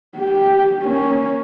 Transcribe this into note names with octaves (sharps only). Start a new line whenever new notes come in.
G4
A#3 C#4